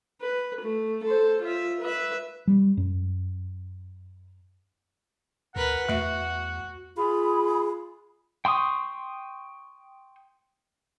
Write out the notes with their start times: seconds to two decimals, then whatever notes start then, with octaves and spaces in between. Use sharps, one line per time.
0.22 B4
0.62 A3
1.04 A4 C5
1.43 F4 E5
1.81 B4 E5
2.48 G3
2.77 F#2
5.56 D2 A#4 B4 F#5
5.89 E2 A3 F#4 E5
6.96 F4 G#4 B5
8.45 G5 C6 C#6 D#6